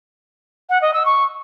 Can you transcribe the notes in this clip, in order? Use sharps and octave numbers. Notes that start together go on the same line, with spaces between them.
F#5
D#5
E6
C#6